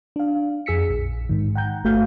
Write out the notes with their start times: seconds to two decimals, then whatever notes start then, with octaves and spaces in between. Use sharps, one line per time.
0.16 D4 F5
0.66 F2 G#4 E6 B6 C#7
0.89 A#1
1.29 G#2 D#3
1.55 F#5 G5 A#5 G6
1.84 G1 A3 F#4 F5 G6